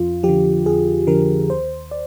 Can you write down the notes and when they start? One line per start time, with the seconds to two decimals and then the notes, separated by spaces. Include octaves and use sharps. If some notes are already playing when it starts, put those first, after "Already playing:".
Already playing: F2 F4
0.23 D3 F3 G4
0.66 F2 G#4
1.07 D3 F3 A#4
1.50 D#2 C5
1.91 D5